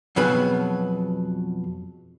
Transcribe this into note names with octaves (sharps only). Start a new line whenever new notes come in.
F2 B2 F#3 B3 G#4 B5